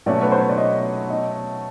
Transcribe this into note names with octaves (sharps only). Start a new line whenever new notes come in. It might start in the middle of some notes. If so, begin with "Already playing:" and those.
B2 F#3 A3 C#4 F#4 D5
B4
C5
C#5
D5
D#5
D#5